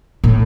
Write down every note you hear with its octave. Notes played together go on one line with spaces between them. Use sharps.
A2